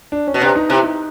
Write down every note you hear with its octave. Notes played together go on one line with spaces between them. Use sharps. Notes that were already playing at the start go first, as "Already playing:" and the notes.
D4
C#4
B2
C3 D4
D#4
C3 E4
D#4